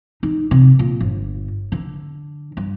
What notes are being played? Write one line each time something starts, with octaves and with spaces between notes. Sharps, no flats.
D#4
C3
A#2
G1
D3
G2